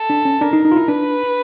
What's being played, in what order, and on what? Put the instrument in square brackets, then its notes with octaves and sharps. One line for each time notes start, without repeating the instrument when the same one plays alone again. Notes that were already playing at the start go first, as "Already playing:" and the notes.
Already playing: [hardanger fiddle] A4
[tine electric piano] D4
C#4
[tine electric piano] D4 [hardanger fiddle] A#4
[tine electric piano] D#4
D#4
F4
E4
[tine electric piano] D4 [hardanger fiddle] B4